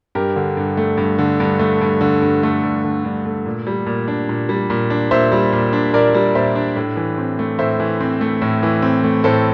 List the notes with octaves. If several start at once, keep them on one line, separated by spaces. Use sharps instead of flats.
G2 G4 A#4
D3
G2
A3
G2
D3
G2
A3
G2
D3
G2
A3
G2
D3
G2
A3
A#2
G3
A#2
D4
A#2
G3
A#2
D4
A#2 C5 E5
G3
A#2
D4
A#2 A#4 D5
G3
A#2 C5 E5
D4
A2
E3
C4
A3
A2 C5 E5
E3
C4
A3
A2
E3
C4
A3
A2 A4 C5